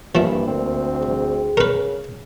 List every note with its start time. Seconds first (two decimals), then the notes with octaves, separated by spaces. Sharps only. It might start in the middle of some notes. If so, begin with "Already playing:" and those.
0.15 G2 E3 F3 A#3 E4
0.47 D2 C4
1.00 G#4
1.57 C#3 A#4 B4